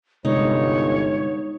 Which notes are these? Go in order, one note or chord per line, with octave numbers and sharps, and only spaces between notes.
G1 C3 G#3 D#4 C#5